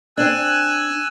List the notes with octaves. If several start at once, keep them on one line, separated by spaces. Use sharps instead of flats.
C4 D4 G#5 E6 F#6